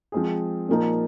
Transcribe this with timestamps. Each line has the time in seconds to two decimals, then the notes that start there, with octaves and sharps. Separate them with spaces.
0.12 F3 G#3 C4 G#4
0.69 A#2 F3 A#3 D#4